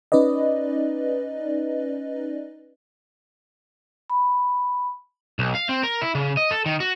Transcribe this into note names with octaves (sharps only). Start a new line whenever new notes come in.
C#4 D#4 B4 D5 D#5
B5
B1
F5
C4
A#4
E4
C#3
D#5
A4
D#3
F#4